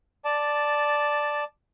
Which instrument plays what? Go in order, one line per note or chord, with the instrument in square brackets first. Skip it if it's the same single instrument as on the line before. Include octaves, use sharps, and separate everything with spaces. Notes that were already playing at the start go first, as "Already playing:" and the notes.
[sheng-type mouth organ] D5 A5